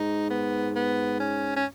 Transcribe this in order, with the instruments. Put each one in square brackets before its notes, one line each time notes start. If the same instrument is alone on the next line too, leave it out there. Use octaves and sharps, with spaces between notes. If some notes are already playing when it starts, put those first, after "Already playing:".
Already playing: [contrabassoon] G#2 [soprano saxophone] D#4
[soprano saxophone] B3
B3
C#4
C#4